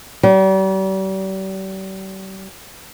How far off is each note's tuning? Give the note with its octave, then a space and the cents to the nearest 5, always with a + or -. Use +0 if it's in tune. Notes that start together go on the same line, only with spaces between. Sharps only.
G3 -40